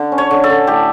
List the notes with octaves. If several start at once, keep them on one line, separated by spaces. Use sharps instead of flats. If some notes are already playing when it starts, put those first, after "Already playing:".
Already playing: D3
C#4
C#5
D3
A4
D3
A2 G4